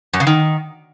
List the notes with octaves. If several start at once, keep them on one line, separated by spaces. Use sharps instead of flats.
F#2
C#3
D#3